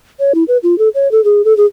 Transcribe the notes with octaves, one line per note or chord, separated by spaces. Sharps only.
C#5
E4
B4
F4
A4
C#5
A4
G#4
A4
G#4